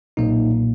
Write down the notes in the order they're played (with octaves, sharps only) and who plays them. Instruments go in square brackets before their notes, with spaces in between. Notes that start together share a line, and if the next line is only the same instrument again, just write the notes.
[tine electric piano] B1 A#2 A#3 D#4